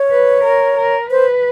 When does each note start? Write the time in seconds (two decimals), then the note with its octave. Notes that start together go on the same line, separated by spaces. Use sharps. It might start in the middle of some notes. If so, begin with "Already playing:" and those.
Already playing: C#5
0.11 B4
0.44 A#4
0.78 A#4
1.10 B4 C5